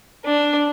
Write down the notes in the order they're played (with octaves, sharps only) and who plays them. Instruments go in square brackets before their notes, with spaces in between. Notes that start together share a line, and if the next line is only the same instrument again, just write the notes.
[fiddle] D4